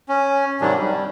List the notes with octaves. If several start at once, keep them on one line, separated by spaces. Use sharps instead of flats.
C#4
G#2 C3 D#3 F#3 G3 D4
G3